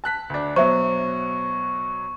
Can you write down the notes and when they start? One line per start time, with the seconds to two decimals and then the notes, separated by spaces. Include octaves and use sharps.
0.04 A5 F#6 B6
0.30 D2 D4
0.56 B2 F#3 C5 E5 C#6